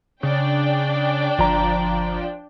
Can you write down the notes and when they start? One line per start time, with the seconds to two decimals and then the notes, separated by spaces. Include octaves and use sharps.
0.23 C#3 D4 D5 G5
1.39 G1 F3 A#5